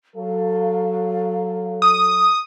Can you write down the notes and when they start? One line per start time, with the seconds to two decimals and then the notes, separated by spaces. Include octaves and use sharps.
0.16 F#3 A4 F5
1.82 D#6